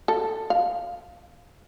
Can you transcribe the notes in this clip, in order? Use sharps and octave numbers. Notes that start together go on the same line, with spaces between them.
A4
F5